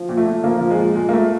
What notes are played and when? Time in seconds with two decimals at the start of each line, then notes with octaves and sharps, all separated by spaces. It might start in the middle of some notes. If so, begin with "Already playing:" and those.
Already playing: F3
0.09 A#2
0.17 A3
0.26 A#2
0.44 F3 A#3
0.61 F3
0.70 G#3
0.78 A#2
0.96 A#2 G#3
1.09 A#3
1.13 A#2 A3